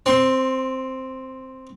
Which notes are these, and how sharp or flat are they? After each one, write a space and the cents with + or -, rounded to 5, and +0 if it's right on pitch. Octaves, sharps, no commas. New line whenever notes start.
C4 +0 C6 +25